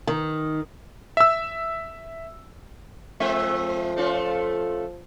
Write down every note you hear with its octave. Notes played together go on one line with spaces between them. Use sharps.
D#3
E5 E6
F3 G#3 C4 E5
A3 C#4 F4